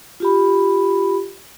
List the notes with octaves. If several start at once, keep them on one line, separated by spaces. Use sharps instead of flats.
F4 G4 B5